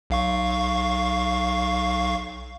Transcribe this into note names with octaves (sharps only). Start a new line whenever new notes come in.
B1 F5 C#6